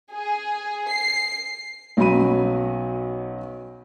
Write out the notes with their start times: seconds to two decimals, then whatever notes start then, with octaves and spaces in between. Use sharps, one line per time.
0.12 G#4
0.89 C7
1.97 B1 F#3 C#4 F#4 B5 D#7